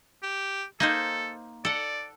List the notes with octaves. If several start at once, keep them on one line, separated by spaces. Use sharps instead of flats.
G4
A#3 D#4 A4 C5
A4 D5 F#5